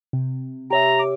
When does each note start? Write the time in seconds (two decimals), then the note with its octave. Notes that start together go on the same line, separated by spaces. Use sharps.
0.13 C3
0.71 G4 C#5 E5 A#5
0.99 D6